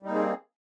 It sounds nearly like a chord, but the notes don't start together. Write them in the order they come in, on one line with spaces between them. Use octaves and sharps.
G3 D#4 A#3 C4 G#4